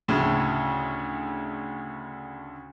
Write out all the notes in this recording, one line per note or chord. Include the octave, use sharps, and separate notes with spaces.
D2 A2 C#3